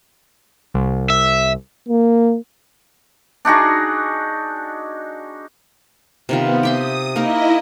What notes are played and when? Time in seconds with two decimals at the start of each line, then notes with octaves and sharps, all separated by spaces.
0.74 C2
1.10 E5
1.89 A#3
3.45 D4 D#4 F#4 G#4
6.29 C3 D#3 B3 F4
6.63 G4 E5 C6 D#6
7.16 A#3 D#4 E4 A#4 D#5